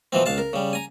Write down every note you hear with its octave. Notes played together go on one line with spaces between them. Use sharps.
B2 E3 F3 C4
C#2 F5 A5
A#4
C#3 G3
G#5 A#5